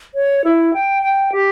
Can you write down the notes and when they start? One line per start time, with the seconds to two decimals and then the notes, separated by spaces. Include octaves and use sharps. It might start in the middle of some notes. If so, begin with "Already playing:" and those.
0.15 C#5
0.44 E4
0.74 G5
1.02 G5
1.32 G4